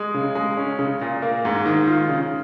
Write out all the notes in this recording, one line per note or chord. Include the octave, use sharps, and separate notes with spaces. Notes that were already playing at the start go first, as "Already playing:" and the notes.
Already playing: G#3
C#3
G#3
C#4
C#3
A#2
A#3
G#2
D#3
F4
C#3